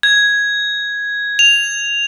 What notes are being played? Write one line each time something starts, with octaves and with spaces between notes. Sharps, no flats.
G#6
F7